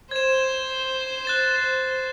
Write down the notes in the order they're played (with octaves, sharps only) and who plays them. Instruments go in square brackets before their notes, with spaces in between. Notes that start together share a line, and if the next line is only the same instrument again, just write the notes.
[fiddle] C5 [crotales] G#6 E7
[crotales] F#6 A6 E7